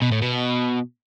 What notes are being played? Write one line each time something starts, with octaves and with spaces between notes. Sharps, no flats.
B2
A2
B2